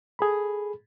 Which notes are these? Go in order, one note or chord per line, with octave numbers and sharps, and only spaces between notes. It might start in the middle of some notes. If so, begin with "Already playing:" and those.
G#4 A4 B5